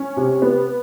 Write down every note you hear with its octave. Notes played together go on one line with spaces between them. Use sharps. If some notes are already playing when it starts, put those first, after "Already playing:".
Already playing: C#4
C3
B3